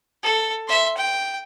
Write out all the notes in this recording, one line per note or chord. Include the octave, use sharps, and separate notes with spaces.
A4
E5 C6
G5